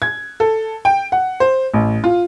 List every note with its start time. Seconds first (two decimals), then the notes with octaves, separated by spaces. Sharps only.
0.02 G#6
0.40 A4
0.85 G5
1.12 F#5
1.40 C5
1.74 A1
2.04 F4